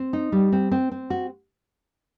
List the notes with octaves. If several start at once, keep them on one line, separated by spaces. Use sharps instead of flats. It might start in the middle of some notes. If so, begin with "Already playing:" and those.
Already playing: C4
D#4
G3
C4
C4
C4
F#4